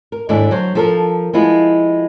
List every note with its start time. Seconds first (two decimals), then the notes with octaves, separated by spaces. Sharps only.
0.12 A#4
0.29 D#2 G#2 D3 E4 A4 D5
0.51 F#3 C5
0.75 F3 A4 A#4
1.33 F3 G#3 B3 E4 F4